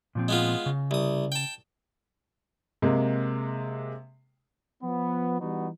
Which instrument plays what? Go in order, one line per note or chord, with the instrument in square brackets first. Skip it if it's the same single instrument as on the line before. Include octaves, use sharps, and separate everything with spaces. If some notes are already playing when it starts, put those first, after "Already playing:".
[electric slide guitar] A#2 F3 C4
[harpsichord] G#3 B3 F4
[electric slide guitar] C#3
[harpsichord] C2 D#6
G5 A5
[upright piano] C3 G#3 A#3
[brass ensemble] F3 B3
E3 G3 B3 D#4 F#4